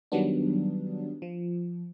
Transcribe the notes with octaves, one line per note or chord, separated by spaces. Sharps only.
D#3 F#3 G3 B3 D4
F3